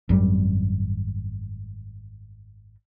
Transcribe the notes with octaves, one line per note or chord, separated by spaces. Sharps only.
G#1 F#2 F#3 G3